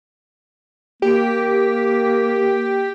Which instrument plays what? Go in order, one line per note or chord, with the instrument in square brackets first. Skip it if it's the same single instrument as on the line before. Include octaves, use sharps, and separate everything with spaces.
[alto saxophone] A#3 [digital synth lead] G4